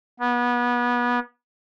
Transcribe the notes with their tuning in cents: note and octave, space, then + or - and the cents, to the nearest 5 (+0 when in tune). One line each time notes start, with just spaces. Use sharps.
B3 -25